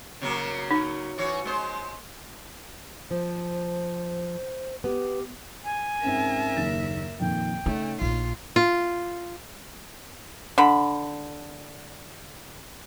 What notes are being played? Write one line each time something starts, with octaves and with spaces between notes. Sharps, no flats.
C#3 F#3 A#3
D#4
E3 F#4 C#5
G#3 C5
F3 C5
B3 G4
G#5
G#2 C4 C#4 A#4 E5
F#1 D#2 A6
F2 A#2 D#3 G5
C#3 A3 D#4 C#5
A#1 F4
F4
D3 B5